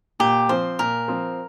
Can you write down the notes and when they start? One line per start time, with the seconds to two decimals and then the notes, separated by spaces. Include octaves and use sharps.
0.20 A#2 G4
0.49 F3 C4 C5
0.79 A#2 A#4
1.08 F3 C4